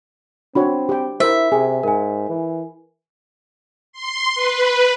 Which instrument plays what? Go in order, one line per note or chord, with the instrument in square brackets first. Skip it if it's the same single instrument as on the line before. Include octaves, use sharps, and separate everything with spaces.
[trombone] C4 [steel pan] D4 F#4 C#5 [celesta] B5
[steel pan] G4 G5
[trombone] E4 [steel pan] A#4 C5 [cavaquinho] E5 [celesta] E6
[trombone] C3 [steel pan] G#4 [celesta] G#5
[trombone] G#2 [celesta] A#4 G#5
[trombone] E3
[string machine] C6
B4